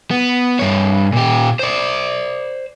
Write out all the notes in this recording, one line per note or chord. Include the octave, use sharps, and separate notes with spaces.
B3
G2 C#5
A#2 G4
C5 D5